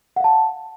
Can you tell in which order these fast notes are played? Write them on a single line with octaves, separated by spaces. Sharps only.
F#5 F5 A5